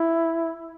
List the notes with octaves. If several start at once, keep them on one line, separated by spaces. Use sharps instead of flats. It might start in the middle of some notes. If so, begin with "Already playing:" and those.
Already playing: E4